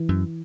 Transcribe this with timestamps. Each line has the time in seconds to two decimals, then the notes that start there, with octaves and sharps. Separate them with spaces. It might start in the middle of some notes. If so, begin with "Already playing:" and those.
Already playing: E3
0.09 F#2